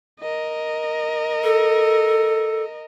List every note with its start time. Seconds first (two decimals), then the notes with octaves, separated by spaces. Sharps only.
0.21 A#4 D#5
1.44 A4